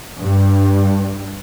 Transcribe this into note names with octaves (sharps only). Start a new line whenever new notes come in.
G2